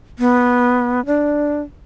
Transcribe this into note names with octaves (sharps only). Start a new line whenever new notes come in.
B3
D4